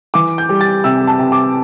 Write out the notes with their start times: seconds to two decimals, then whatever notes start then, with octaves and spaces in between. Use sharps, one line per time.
0.14 E3 D6
0.38 G6
0.49 G3
0.61 A6
0.84 C3 E6
1.07 A5
1.19 C3
1.32 D6